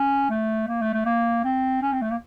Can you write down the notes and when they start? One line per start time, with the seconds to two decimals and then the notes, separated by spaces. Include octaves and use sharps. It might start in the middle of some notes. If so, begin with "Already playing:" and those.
Already playing: C#4
0.30 A3
0.68 A#3
0.81 A3
0.93 A3
1.06 A#3
1.44 C4
1.82 C#4
1.92 C4
2.02 A3
2.11 A#3